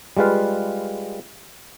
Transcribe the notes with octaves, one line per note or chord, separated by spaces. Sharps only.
G3 G#3 F4 B4 F5